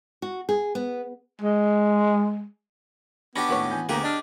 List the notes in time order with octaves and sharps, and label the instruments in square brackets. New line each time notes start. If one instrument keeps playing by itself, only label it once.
[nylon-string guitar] F#4
G#4
B3
[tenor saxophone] G#3
[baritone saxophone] B3 [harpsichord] C#4 D4 G4 [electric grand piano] B5 A#6
[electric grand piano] D#2 A2 [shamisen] F#4 B4 C#5
[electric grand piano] E3 G#5 G6
[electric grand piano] D2 B3 A#5 [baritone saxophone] A#3 [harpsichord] G4 G#4
[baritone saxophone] D4 [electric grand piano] D#5 D#6 F6